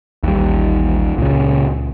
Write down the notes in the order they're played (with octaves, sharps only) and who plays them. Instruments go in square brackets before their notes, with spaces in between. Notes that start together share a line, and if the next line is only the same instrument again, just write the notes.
[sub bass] A1 [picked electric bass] D#2 G3
[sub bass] C#2 [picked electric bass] A#2 C#3